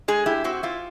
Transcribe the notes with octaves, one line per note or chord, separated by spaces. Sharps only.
G#3 G#4
E4 G4
C4 F#4
E4 F4